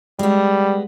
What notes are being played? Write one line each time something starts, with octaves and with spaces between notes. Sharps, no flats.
G3 G#3 B3